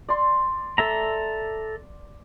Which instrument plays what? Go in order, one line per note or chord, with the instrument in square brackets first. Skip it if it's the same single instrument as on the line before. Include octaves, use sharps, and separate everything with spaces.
[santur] D5 C6
[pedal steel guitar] A4 E5 A#5